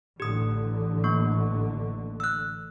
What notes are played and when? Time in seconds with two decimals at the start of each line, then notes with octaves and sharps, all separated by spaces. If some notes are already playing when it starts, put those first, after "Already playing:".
0.20 A1 D3 G4 D#6
1.04 A#3 C#6
2.20 E6 F#6